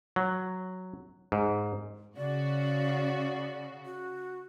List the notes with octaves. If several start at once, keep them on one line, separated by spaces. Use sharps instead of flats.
F#3
G#2
C#3 F#4 D5
F#4